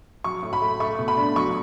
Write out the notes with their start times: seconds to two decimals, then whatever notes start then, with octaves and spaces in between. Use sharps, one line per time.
0.24 F#3 C#6
0.43 A2
0.53 B5
0.61 A3
0.80 A3 C#6
0.98 B2
1.08 B5
1.17 D4
1.36 F#3 C#6